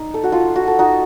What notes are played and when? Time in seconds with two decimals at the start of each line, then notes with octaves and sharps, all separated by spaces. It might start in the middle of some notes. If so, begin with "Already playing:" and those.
Already playing: D#4
0.14 A4
0.24 F#4
0.32 F4 A4
0.56 F#4
0.68 A4
0.79 D#4 F#4